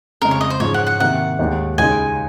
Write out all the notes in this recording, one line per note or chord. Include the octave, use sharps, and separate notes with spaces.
F2 C#3 G#3 A#4
C#5
D#5
C5
G#2 F3 G#3 C#4 C#5
F#5
F#5
C3 D#3 A#3 F#5
D#2 D#3 G#3
C#2 C#3 G#3 D#4 G#5